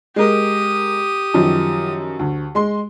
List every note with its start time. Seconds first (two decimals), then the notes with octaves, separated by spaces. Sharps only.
0.16 G#3 G4 A#4 D#6
1.34 F#2 D#3 F3
2.19 D2
2.55 G#3 C6